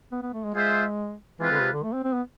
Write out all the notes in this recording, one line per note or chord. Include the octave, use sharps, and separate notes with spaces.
B3
B3
A3
G#3
G#3 F4 G#4 C5 E5
E3 G#3 C4 F4 B4
D3
C3
D3
A3
C4
C4
B3